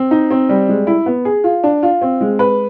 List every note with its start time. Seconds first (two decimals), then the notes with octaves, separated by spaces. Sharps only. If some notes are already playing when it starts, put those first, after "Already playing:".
Already playing: C4
0.11 D#4
0.31 C4
0.49 G3
0.69 G#3
0.87 E4
1.06 B3
1.25 G#4
1.44 F4
1.64 D4
1.83 F4
2.02 C4
2.21 G#3
2.39 B4